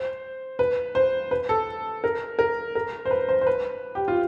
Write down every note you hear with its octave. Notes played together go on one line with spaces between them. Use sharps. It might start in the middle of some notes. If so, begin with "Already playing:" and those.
Already playing: C5
B4
C5
B4
A4
A#4
A#4
A#4
C5
B4
C5
C5
B4
G4
F4